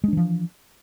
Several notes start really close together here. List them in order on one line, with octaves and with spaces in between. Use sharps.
G#3 D4 E3 F3